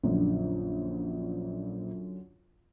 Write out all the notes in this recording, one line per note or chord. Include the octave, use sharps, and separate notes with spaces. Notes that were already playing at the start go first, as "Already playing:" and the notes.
A#1 F#2 D3